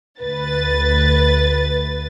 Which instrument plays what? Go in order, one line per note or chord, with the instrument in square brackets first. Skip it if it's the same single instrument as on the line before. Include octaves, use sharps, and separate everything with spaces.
[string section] D2 B4 A6